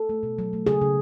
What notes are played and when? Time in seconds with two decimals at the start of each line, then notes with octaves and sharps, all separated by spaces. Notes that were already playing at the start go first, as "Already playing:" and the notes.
Already playing: A4
0.09 A3
0.23 B2
0.39 F#3
0.53 A3
0.66 C#3 G#4
0.81 C#3